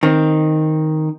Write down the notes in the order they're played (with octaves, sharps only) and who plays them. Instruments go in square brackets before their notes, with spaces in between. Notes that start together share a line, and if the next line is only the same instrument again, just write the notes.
[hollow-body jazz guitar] D#3 C4